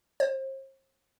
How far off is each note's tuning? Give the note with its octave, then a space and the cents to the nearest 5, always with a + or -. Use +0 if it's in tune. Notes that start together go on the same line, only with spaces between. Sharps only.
C5 +40